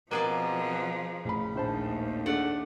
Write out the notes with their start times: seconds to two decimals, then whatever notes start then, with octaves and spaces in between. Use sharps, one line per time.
0.11 B2 F3 A#3 C4 G#4 D5
1.25 A1 C#3 B5
1.55 A#1 D#2 A2 C5 A5
2.26 A3 D4 G#4 D5 F#5